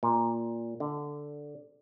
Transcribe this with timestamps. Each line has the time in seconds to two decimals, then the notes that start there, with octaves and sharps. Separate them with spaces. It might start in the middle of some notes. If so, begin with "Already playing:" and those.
0.03 A#2
0.80 D3